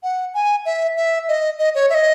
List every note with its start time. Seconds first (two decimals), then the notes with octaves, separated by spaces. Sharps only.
0.03 F#5
0.34 G#5
0.66 E5
0.97 E5
1.28 D#5
1.59 D#5
1.75 C#5
1.90 E5
1.95 D#5